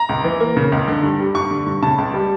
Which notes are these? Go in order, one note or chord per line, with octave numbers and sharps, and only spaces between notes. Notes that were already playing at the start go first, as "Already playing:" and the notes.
Already playing: A#5
C#2
E3
A#3
C#3
C#2
D3
G2
G3
G2 C#6
D3
G2
C#3 A5
C#2
G3